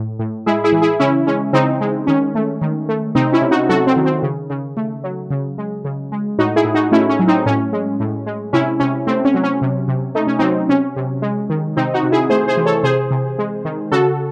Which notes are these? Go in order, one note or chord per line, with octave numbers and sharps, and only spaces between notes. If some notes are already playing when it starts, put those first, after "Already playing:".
Already playing: A2
A2
G#3 E4 G#4
E4 G#4
E3
E4 G#4
C#3 C#4 E4
G#3 C#4
C#3 C4 D#4
G#3
D#3 C#4
A3
D#3
A3
C3 C4 D#4
C#4 E4
C3
D#4 F#4
F#3 F#4 A4
C4
D#3
C4
C#3
C#3
A3
F#3
C#3
G#3
C#3
G#3
A2 D#4 F#4
E4 G#4
A2
D#4 F#4
A3 C#4 E4
C#4
F#3
C4 D#4
A2 C#4
G#3
A2
G#3
C3 C#4 E4
C3 C#4
A3 C4
C#4
F#3
C#4
C3
C3
A3 D#4
C#4
F#3 C4 D#4
C3 C#4
C3
G#3
D#3
C3 C4 D#4
D#4 F#4
C3
E4 G#4
A3 G#4 C5
G#4 C5
E3
A4 C#5
C3 G#4 C5
C3
G#3
D#3
C#3 F#4 A4